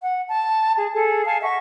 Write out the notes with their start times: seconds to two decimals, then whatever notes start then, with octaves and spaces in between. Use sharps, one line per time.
0.01 F#5
0.27 A5
0.77 G#4
0.93 G#4 A4
1.25 F5 G#5 A5
1.41 D#5 E5 F#5 C#6